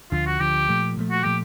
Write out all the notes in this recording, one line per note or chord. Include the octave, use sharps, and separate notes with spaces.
D2 D3 F3 F4
F#4
D2 D3 F3 G4
A#2 F3 A3
A#2 F3 A3
F#4
A#2 F3 A3 G4